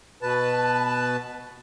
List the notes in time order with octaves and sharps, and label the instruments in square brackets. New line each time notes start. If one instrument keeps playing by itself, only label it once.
[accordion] B2 B4 A5